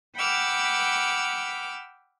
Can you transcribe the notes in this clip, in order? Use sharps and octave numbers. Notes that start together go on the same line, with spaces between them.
F#5 G5 B5 D6 E6 F6